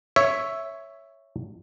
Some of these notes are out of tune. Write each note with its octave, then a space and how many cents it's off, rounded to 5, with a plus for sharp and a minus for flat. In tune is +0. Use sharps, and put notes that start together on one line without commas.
C#5 +0 E5 +0